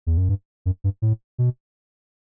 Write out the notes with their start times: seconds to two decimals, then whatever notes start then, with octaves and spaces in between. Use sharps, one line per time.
0.07 E2
0.17 F#2
0.29 G2
0.66 F#2
0.84 G2
1.02 A2
1.38 B2